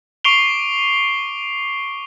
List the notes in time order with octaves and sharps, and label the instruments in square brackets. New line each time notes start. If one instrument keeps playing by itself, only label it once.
[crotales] C#6 D6 C7 D7 F7 G7